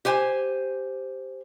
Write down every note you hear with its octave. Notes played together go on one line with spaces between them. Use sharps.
G4 C5 G#5